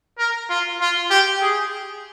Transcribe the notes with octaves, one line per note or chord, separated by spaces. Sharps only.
A#4
F4
F4
G4
G#4